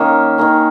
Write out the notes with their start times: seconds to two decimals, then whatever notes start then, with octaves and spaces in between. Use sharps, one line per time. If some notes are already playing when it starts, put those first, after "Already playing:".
Already playing: D#3 A#3 C#4
0.38 D#3 A#3 C#4